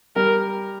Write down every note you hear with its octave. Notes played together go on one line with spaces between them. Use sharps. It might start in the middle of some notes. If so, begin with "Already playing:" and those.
G3 A#4